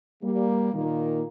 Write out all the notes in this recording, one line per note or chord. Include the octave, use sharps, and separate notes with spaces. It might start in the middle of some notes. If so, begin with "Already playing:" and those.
G3 A#3
A#2 D#3 A#3